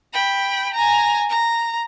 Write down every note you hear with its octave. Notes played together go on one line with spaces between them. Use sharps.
G5 B5
G#5 A#5
A#5